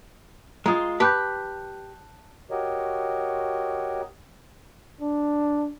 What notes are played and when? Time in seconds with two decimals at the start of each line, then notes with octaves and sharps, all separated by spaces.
0.66 G#3 F4 A#5 D#6
1.00 G4 B4 A5 F#6 G6
2.51 F#4 G4 A#4 C#5 D#5
5.01 D4